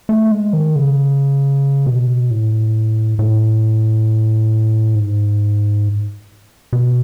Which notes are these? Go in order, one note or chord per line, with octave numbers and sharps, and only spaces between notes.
A3
G#3
D#3
C#3
B2
A2
A2
G#2
B2